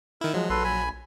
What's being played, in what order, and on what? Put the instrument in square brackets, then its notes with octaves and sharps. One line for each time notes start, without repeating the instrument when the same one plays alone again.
[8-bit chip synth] D#3 E4 [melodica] A#4
[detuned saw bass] F3 [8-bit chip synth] F#3 [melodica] G#3
[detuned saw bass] A#1 [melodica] A4 B4 C6
[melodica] G#5 B5